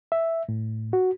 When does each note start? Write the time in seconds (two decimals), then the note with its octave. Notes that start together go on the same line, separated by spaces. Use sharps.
0.12 E5
0.49 A2
0.93 F#4